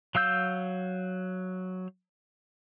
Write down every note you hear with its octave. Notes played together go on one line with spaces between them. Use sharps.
F#3 F5 E6 G6